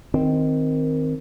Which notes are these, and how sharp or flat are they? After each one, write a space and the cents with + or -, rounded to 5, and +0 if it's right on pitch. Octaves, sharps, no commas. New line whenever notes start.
D#3 +0 C4 -5